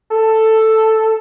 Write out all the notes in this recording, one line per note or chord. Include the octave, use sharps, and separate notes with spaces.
A4